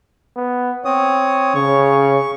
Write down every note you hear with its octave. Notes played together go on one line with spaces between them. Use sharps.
B3
C4 C#5 D#6
C#3 C#6